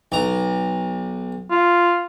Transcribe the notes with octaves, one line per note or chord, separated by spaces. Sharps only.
B1 A#5
F4